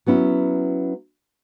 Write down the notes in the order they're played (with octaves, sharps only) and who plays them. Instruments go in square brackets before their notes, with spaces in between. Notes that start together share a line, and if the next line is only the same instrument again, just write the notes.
[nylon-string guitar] F#3 B3 C#4 E4